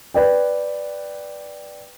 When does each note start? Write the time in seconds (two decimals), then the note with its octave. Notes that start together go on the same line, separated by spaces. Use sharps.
0.14 B4 D5 G5